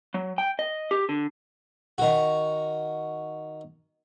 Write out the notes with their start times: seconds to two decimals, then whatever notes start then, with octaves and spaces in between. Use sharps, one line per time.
0.14 F#3
0.38 G5
0.59 D#5
0.91 G4
1.09 D3
1.98 D#3 F#4